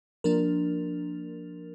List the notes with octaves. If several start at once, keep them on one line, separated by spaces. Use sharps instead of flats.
F3 A#3 D4 A#4